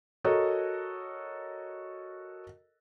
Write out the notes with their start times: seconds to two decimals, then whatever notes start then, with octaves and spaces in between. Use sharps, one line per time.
0.24 F#4 A4 A#4 C#5 D#5